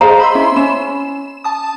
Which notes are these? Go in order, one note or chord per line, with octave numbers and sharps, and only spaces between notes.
G#4 C5 D#5 F5 A#5
B5 C6 E6
C#4 E4 E5
C#4 E7
A5 D#6